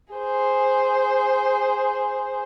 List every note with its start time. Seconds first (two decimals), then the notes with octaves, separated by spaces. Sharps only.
0.14 G#4 C5